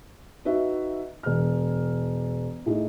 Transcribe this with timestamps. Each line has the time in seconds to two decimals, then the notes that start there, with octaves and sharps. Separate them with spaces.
0.45 D#4 F#4 B4 E5
1.23 E1 F6
2.66 A2 D#4 G#4